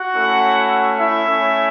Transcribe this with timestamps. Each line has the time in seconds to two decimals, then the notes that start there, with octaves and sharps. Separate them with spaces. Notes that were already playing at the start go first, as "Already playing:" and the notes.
Already playing: F#4 F#5
0.14 A3 C#4 E4
0.99 E4 E5
1.28 A3 C#4 E4